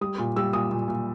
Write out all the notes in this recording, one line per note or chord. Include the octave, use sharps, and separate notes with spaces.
G3 D#6
A#2
G3 E6
A#2 D#6
A#2
A#2